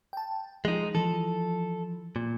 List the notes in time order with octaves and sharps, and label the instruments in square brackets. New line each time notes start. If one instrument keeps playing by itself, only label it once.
[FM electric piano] G5 A5
[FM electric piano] F3 [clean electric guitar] G#3 D#4
[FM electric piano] E3 F3 [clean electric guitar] A4
[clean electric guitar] A#2